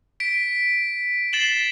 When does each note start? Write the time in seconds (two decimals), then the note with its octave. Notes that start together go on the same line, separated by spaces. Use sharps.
0.20 B6 D7
1.33 A6 C7 E7 F#7 G7